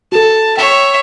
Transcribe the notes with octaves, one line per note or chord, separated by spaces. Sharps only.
F#4 A4 A5
C#5 E5 G5